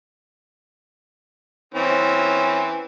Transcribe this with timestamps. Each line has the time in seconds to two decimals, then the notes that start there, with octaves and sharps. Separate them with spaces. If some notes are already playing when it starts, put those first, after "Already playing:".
1.74 E3 C4 C#4